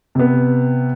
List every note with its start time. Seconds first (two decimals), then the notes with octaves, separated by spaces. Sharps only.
0.15 C3 B3